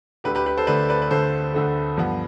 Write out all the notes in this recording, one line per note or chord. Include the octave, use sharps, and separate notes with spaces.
D2 D3 A3 G4 B4
G4 B4
G4 B4
A4 C5
D2 D3 A3 B4 D5
B4 D5
B4
D2 D3 A3 A4 C5
D2 D3 A3
G2 F3 B3